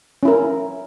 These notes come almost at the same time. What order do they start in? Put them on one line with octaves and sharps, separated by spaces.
C#4 E4 A#4